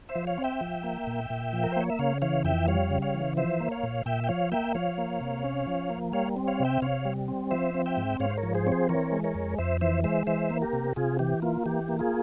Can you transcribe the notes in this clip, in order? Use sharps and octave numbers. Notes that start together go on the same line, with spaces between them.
C5 E5
F3
C#5 F5
C4
E5 G5
F3
A#3
A#2
A#2
F3
A#4
C5
A#3 C#5
E5
C#3 C#5 F5
E3 C#5 F5
F2 E5 G5
G3 C#5 F5
C#3
C#5 F5
E3
F3 C5 E5
A#3
C#5 F5
A#2
A#2 E5 G5
G5
F3 C#5 F5
A#3 E5 G5
F3 C#5 F5
A#3
C3
C#4
F3
A#3
G3 C#5 F5
C4
C#5 F5
C3 E5 G5
C3 C#5 F5
G3
C4
F3 C5 E5
C4
E5 G5
G#2
G#2 C#5 F5
C5
A#4 C#5
F3
G#4 C5
C4 G#4 C5 C#5
E3 A#4 C#5
G#3
A#4 C#5
F2
F2 C5 E5
E3 C5 E5
G#3 C5 E5
E3 C5 E5
A#3
G4 A#4
C3
C3 F4 G#4
E3 G4
A#3 F4
E3 G4
A#3
F4 G#4